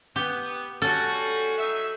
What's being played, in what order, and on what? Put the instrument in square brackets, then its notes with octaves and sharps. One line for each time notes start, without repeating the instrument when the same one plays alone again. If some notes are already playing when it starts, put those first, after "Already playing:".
[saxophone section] B3 [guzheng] G4
[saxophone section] G3 C#4 F#4 [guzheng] A4
[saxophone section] F#3 D#4 E5